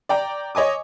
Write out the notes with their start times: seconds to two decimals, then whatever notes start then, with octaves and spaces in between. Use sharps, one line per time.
0.09 D5 G5 A#5
0.55 C#5 D#5 G#5 D6